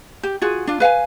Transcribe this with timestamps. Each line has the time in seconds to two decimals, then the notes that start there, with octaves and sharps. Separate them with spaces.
0.23 G4
0.42 F4 F#4 G#4
0.67 D4 F4
0.80 B4 F5 F#5 G#5